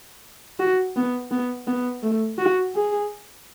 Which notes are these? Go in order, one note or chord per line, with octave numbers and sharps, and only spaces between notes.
F#4
B3
B3
B3
A3
F#4
G#4